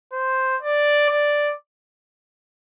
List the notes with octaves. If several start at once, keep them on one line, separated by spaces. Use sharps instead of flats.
C5
D5
D5